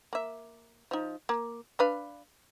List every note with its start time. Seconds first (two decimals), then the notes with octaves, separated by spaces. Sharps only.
0.13 A#3 E5
0.91 F3 D#4
1.29 A#3
1.79 D4 B4 F5